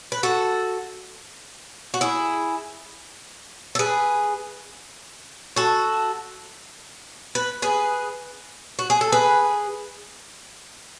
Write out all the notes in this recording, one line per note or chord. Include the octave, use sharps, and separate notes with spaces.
B4
F#4 A4
F#4
E4 G#4
A4
G#4 B4
F#4 A4
B4
G#4 B4
F#4
G#4
A4
G#4 B4